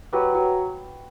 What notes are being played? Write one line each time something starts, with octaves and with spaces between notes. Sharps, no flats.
F#3 G4 B4
F#3